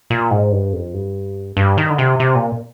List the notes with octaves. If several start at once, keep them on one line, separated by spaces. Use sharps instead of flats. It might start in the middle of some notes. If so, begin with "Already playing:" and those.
A#2
G#2
G2
F2
G2
G2
D#3
D3
C3
C3
A#2